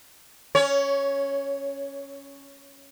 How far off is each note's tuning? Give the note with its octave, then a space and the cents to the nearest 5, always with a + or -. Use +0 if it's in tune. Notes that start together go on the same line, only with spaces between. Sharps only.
C#4 +0 C#5 +20